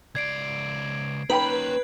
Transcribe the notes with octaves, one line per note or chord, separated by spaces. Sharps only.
C#2 D5 G#6 C7 D7
A#3 C#4 D#4 B4 G5 B5